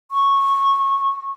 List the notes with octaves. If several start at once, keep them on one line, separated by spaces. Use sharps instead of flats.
C#6